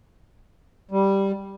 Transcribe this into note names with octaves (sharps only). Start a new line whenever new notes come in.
G3